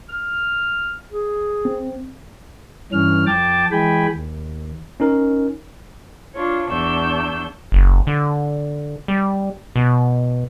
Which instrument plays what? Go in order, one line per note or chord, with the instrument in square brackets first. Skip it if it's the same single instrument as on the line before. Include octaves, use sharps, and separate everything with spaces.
[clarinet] F6
G#4
[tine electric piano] C4
[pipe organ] G2 E3 C#4 F6
F2 G5 A5 D6 A6
E3 G#3 G5 G#5 B5
D#2
[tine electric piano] C#4 D#4 A#4
[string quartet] D4 F4 C#5
E2 D4 C#6 E6 G6
[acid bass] F#1
D3
G3
B2